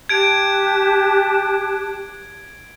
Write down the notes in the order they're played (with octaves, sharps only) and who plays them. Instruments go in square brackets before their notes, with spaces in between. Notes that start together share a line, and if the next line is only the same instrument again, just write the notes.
[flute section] G4 A5 F#6 [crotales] G#6 D7